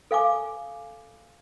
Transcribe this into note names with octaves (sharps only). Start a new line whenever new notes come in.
A4 F5 G#5 D6